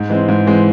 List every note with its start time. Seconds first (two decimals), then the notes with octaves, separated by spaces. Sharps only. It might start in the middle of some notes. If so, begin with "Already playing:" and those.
Already playing: G#2
0.09 E3 G#3 C4
0.29 G#2
0.47 E3 G#3 C4